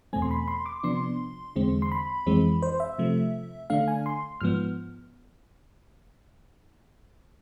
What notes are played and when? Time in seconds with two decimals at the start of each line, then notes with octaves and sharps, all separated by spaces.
0.13 E2 B2 A3 C4 G#5
0.22 C6
0.31 B5
0.48 C6
0.66 D6
0.83 C3 F3 B3 D4 C6
1.56 E2 D3 G#3 C4
1.82 C6
1.92 B5
2.26 F2 E3 G#3 C4
2.62 C5
2.80 E5
2.98 C3 F3 A3
3.70 D3 A3 D4 F5
3.88 G#5
4.06 C6
4.41 G#2 F3 B3 F6